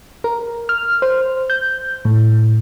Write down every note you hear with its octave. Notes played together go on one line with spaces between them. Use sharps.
A#4
F6
C5
G6
A2